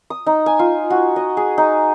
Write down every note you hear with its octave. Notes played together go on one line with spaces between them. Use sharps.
D#6
D#4
G#5
F4
F#4
D#5
G#4
D#4